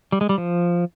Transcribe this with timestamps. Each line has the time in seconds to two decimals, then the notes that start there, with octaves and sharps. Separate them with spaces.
0.12 G3
0.21 G#3
0.29 G3
0.38 F3